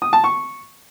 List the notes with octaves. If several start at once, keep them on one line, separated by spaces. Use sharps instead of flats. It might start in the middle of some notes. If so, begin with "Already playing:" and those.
D#6
A5
C#6